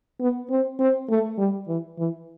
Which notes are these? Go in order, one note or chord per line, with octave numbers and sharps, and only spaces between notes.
B3
C4
C4
A3
G3
E3
E3